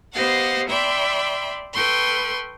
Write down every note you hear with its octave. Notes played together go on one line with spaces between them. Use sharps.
B3 G4 C5 D#5 F5 F#5
D5 E5 G5 B5 C6
A4 B4 G5 C6 C#6